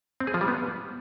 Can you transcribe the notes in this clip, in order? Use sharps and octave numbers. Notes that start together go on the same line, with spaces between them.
C4
G#4
F3
G3
B3